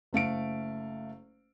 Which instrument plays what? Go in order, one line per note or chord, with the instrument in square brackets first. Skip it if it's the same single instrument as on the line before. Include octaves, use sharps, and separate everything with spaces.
[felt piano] F#1 A3 F5 D7